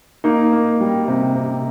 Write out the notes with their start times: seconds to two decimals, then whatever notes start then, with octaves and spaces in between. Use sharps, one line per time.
0.24 A#3 D#4
0.52 A#3
0.80 G3
1.08 C3
1.36 C3